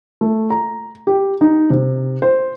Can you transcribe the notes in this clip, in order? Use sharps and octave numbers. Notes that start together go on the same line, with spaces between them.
A3
A#5
G4
D#4
C3
C5